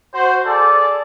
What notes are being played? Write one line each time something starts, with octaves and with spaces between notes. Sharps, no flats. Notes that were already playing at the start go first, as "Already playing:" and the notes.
F#4 C5
G#4 A4 D5